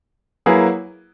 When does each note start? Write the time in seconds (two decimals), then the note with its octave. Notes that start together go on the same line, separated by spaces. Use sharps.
0.46 F#3 A#3 E4 G#4 B4